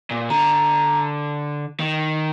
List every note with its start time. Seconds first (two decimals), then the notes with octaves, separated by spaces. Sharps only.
0.11 A#2
0.30 D3 A#5
1.80 D#3